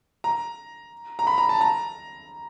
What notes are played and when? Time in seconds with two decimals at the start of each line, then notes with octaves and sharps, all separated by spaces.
0.24 A#5
1.19 A#5
1.27 B5
1.38 A#5
1.49 A5
1.61 A#5